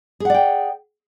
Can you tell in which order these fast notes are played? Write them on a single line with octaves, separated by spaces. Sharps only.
G#4 F#5 D5 G5